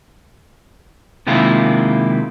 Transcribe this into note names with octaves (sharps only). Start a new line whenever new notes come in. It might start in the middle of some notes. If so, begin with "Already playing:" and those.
C3 D#3 G#3 A#3 E4 F4